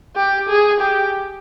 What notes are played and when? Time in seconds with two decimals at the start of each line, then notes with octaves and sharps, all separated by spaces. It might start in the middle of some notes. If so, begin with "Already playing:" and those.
0.16 G4
0.49 G#4
0.80 G4